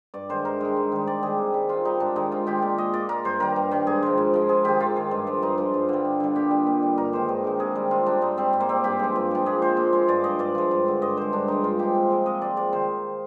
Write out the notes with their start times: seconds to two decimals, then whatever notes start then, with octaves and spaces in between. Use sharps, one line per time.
0.14 G2 D5
0.29 D#3 G#3 C5
0.45 G2 A#4
0.60 D#3 G#3
0.76 G#2
0.92 D#3 G3
1.07 G#2 D5
1.23 D#3 G3 G#4
1.38 C3
1.54 G3
1.69 C3 F4
1.85 G3 D#4
2.00 G#2 D4
2.16 D#3 G#3 D#4
2.31 G#2 F4
2.46 D#3 G#3 G4
2.62 A#2 D5
2.78 G#3 D#5
2.93 A#2 D5
3.09 G#3 A#4
3.25 G2 C5
3.40 D#3 G3 A#4
3.56 G2
3.71 D#3 G3
3.87 G#2 G#4
4.03 F3 G#3
4.18 G#2
4.34 F3 G#3
4.49 G#2 G#4
4.65 D#3 G#3 G4
4.80 G#2 F4
4.96 D#3 G#3
5.11 G2
5.27 F3 G#3
5.42 G2 D#4
5.58 F3 G#3
5.74 G2
5.89 D3 G3
6.05 G2
6.20 D3 G3
6.36 A#2 G4
6.51 G3
6.67 A#2
6.82 G3
6.98 G2 A#4
7.13 D#3 G#3 C5
7.29 G2
7.44 D#3 G#3
7.60 C3 G#4
7.75 G3
7.91 C3 F4
8.06 G3 D4
8.22 G#2 D#4
8.37 G3 C4
8.53 G#2
8.60 A#3
8.69 G3 C4
8.84 G2 G4
8.99 F3 G#3
9.16 G2
9.31 F3 G#3
9.46 A#2 G#4
9.62 G#3 C5
9.77 A#2
9.93 G#3
10.08 G2 D5
10.24 F3 G#3 D#5
10.39 G2 D5
10.55 F3 G#3
10.71 G2
10.86 D3 G#3
11.02 G2 D#5
11.17 D3 G#3 C5
11.33 G2 D4
11.48 F3 G#3 D#4
11.64 G2 F4
11.79 F3 G#3 G4
11.95 C3
12.10 F3 G#3
12.26 C3 D#5
12.41 F3 G#3 D5
12.57 C3 D5
12.73 D#3 C5